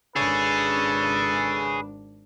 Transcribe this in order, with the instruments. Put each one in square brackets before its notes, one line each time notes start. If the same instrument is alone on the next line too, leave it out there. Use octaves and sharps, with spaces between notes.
[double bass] G#1 D4 [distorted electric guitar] G#4 C#5 [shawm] A4 [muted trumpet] B4